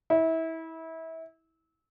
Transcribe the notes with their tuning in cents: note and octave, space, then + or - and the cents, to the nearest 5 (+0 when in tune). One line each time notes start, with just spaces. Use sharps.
E4 -25